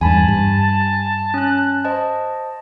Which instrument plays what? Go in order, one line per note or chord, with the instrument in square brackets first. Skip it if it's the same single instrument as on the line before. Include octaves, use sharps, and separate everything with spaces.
[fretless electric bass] E2 G2 [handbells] G#5 B5 [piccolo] A5
[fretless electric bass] G2
[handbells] C#4 F#6
C5 D#5 A5